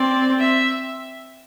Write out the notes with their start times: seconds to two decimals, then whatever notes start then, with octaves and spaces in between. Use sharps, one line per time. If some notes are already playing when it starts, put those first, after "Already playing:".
Already playing: C4 D5
0.39 E5